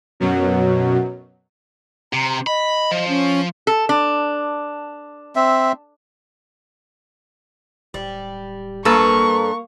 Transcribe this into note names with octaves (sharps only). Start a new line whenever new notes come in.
F#2 B2 F#3
C3 A#5
D#5 B5
F3
C#4
A4
D4
C4 E5
D1 G3
G2 A#3 A4 B4 C#6